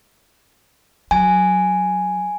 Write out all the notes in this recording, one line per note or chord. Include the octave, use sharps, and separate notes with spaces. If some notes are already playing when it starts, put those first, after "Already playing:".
F#3 G#5